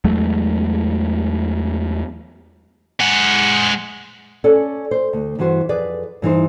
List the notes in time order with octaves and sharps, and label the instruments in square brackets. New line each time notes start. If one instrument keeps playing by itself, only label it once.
[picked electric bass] E2 F#3 G#3 A3
[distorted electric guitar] G#3 F#5
[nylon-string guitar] C#4 A4 D5 G#5
C5
D2
G2 E3 C4 F#4 C5
F2 G#4 B4 D5
G2 E3 D#4 C5